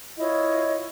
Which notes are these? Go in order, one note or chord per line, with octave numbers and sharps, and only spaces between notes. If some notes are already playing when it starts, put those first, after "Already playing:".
E4 F4 C#5 D#5